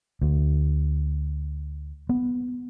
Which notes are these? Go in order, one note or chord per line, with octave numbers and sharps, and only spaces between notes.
D2
B3